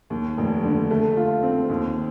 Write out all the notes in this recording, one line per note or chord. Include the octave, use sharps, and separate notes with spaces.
D#2
F1
D3
A3
F4
C4
D#2